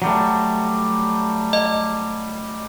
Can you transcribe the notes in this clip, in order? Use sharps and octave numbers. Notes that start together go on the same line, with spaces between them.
F#3 G3 A3
D#5